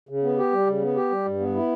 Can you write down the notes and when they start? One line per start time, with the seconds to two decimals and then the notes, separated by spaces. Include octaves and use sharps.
0.09 C#3
0.23 B3
0.38 G4
0.52 G3
0.67 C#3
0.82 B3
0.96 G4
1.11 G3
1.25 G2
1.40 B3
1.55 E4